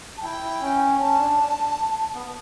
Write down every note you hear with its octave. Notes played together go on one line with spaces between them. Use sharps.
A5
E4 G5
E4
C#4
C#4 A5
D4
B3